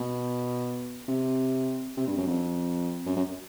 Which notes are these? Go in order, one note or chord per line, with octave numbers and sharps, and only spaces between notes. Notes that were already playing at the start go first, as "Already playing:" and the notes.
Already playing: B2
C3
C3
G2
F#2
F2
F#2
F#2